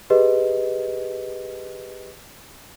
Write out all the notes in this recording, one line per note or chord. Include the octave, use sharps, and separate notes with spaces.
G4 G#4 B4 D#5